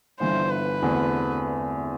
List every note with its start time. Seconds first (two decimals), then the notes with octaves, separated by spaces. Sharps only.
0.20 G1 G2 E3 B3 C5
0.50 B4
0.82 E2 D3 A3 C4 F#4